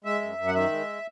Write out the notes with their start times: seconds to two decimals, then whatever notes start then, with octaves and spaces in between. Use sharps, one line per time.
0.05 G#3 E5
0.22 F#2
0.38 F#2
0.48 F#5
0.54 D#3 E5
0.71 G#3